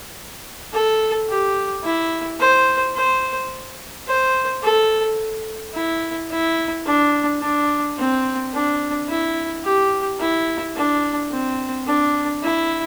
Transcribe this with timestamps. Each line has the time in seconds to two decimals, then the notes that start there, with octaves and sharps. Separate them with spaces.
0.73 A4
1.29 G4
1.84 E4
2.40 C5
2.95 C5
4.07 C5
4.63 A4
5.74 E4
6.30 E4
6.86 D4
7.41 D4
7.97 C4
8.53 D4
9.08 E4
9.64 G4
10.20 E4
10.75 D4
11.31 C4
11.86 D4
12.43 E4